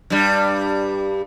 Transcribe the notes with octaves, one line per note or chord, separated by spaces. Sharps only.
G2 G3